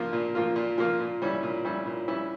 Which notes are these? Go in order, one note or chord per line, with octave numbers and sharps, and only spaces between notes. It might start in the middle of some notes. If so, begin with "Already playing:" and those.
Already playing: A#2 F3 A#3 F4
A#2
F3 A#3 F4
A#2
F3 A#3 F4
A#2
G3 C#4 E4
A#2
G3 C#4 E4
A#2
G3 C#4 E4